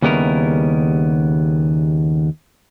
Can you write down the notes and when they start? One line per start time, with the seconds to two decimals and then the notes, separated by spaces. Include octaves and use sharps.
0.02 D#2 C#3 G3 B3 E4 A#4